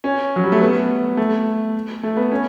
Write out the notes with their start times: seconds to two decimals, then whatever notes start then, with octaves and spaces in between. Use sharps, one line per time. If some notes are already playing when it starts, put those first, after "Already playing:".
0.04 C#4
0.36 F#3
0.44 G3
0.52 A3
0.61 B3
1.17 A3
2.03 A3
2.17 B3
2.32 C#4